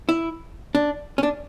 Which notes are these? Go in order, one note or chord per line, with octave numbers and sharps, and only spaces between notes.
E4
D4
C#4
D4